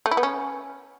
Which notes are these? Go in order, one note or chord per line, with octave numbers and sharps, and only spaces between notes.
A3
E4
B3
C#4